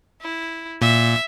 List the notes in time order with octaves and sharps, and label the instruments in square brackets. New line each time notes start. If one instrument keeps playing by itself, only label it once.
[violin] E4
[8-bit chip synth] A#2 [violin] E5